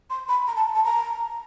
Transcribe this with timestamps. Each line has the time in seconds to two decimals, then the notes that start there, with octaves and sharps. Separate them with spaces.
0.10 C6
0.29 B5
0.48 A#5
0.56 A5
0.75 A5
0.84 A#5